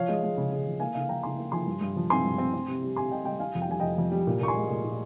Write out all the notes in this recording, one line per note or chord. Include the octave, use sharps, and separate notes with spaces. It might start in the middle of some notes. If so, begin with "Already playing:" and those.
Already playing: F3 C#5 F5
G#3
G#3
C#3
C#3
F3
A#3 F5 G#5
C#3 F5 G#5
F3 G5 A#5
C#3 G#5 C6
A#3
F3 G#5 C6
G2
G2
F3
C4 G#5 C6
G2
C4
C4
C3
G3
C3 G#5 C6
C3 D#5 G5
G3 D#5 G5
G3 F5 G#5
F2
G5
G3 G#5
F2 D#5 G5
F2
G3
A#2
A#2 C#6
G#5 C6
G#3
A#2
A#2